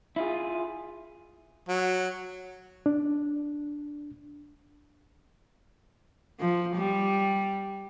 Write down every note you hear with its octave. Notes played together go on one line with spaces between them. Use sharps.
E4 F4 G#4
F#3
D4
F3
G3